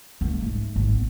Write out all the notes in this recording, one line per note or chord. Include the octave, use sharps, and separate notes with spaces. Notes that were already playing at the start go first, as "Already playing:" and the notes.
C#2 A#3
G#2 A3
G#1
B3